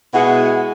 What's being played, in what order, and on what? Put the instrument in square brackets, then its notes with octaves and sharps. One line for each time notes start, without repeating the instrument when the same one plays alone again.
[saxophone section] B2 G#3 B3 E4 G#4 [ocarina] F#5